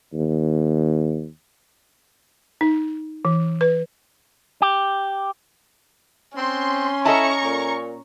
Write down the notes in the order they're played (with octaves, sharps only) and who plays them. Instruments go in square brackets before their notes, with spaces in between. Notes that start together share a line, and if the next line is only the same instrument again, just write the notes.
[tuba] D#2
[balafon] D#4
E3
B4
[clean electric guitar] G4
[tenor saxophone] C4 [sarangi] C#4 [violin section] C6
[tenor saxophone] E4 [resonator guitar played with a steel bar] A4 D#5 A5 [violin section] A#5 C#6
[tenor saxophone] A#2